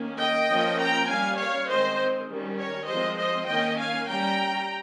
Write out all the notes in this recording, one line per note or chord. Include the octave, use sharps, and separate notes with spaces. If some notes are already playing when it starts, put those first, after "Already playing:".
Already playing: D#3 A#3 C#4
D#5 G5
F3 A#3 C#4
G5 A#5
G3 C#4 F5 G#5
C#5 F5
D#3 G#3 C4 C5 D#5
D#3 G3 C#4
A#4 C#5
F3 G#3 C4 C5 D#5
C5 D#5
D#3 A#3 C#4 D#5 G5
F5 G#5
G3 C#4 G5 A#5